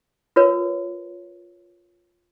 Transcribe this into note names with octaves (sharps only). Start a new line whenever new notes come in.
F4 A#4 B4 C#5